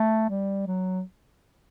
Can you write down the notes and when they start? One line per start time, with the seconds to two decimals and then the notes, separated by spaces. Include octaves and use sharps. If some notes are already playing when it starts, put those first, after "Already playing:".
Already playing: A3
0.29 G3
0.67 F#3